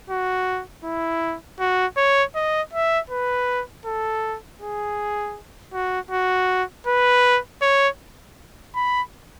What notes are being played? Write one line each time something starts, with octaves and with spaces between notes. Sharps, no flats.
F#4
E4
F#4
C#5
D#5
E5
B4
A4
G#4
F#4
F#4
B4
C#5
B5